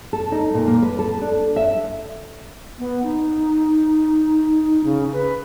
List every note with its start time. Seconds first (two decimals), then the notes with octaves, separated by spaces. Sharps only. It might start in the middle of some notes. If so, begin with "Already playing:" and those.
0.13 A4
0.32 D#4
0.54 A#2
0.67 A#3
0.82 B4
0.99 A4
1.21 D4
1.56 E5
2.79 B3
3.03 D#4
4.84 C#3
5.13 B4